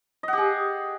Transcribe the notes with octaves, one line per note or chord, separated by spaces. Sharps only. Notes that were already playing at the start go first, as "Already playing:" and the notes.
G4 G#4 D#5 F#5